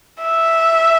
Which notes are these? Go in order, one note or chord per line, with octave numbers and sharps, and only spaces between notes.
E5